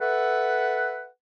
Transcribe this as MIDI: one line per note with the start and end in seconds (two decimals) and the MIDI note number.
0.01 1.07 69
0.01 1.07 71
0.01 1.07 76
0.01 1.07 78